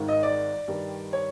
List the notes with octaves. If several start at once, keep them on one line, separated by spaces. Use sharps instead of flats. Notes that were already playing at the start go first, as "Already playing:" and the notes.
Already playing: G#1 G#2 D#3
D#5
D5
G2 D#3 G3
C#5